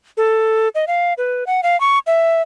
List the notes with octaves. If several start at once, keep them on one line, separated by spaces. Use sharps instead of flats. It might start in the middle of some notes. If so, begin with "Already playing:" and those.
A4
D#5
F5
B4
F#5
F5
C#6
E5